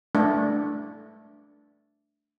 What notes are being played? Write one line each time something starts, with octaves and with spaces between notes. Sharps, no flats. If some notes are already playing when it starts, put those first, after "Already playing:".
A3 D4